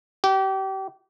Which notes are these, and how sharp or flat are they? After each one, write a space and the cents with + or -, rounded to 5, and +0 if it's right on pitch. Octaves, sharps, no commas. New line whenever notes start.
G4 -30